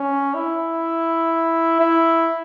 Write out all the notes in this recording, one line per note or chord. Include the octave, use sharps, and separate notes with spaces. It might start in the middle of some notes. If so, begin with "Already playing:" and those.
Already playing: C#4
E4
E4